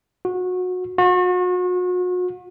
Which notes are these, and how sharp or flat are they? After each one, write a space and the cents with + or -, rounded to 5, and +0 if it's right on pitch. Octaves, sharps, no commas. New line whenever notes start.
F#4 -25
F#4 -40